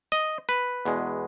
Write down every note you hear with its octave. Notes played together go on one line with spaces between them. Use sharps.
D#5
B4
E2 B2 G#3